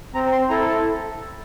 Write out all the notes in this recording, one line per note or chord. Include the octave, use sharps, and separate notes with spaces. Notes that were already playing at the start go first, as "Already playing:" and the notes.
C4 A#5
C6
E4 A4 A#5
A5